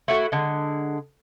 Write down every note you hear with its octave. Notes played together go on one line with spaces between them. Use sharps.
A3 E4 F#4
D3 G#3